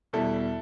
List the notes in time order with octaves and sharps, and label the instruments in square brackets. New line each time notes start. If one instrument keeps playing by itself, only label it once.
[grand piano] E2 B2 G3 E4 A4